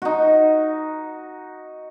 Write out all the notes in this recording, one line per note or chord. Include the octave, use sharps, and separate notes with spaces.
D#4 F#4